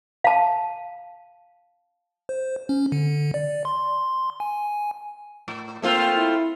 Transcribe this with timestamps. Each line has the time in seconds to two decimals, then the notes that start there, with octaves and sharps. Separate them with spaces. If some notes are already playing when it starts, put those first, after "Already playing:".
0.24 F5 A5
2.29 C5
2.69 C#4
2.92 D3
3.34 D5
3.65 C6
4.40 G#5
5.48 A2
5.82 A3 A#3 C4 F4
6.16 E4